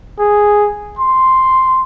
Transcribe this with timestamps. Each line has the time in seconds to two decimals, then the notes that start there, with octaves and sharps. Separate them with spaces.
0.19 G#4
0.99 C6